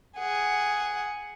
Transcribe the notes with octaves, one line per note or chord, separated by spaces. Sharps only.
G#4 F#5